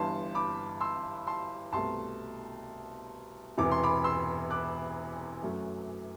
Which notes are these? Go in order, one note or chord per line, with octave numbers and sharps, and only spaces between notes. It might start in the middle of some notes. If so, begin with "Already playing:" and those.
Already playing: G1 G2 E3 A5 C6
B5 D6
C6 E6
A5 C6
C2 B2 A3 A5 C6
E1 E2 C3 E3 D6
C6
B5 D6
C6 E6
D6 F#6
F#2 F#3 A3